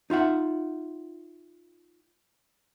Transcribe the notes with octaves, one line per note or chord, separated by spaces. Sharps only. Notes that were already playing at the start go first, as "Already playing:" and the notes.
D#4 F4 E5 F#5